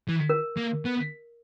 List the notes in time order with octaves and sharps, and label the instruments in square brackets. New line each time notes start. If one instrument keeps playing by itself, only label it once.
[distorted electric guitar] E3
[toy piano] A#4
[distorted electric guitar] A#3
B3